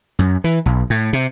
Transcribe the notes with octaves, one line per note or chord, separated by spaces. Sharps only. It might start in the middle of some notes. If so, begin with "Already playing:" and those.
F#2
E3
B1
A2
C3